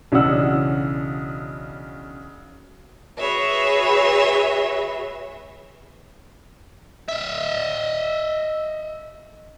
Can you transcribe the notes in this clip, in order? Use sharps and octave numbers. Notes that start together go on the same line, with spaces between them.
B1 C#3 E3 D4 F#5 E6
F#4 G#4 B4 C#5 E5
D#5 E5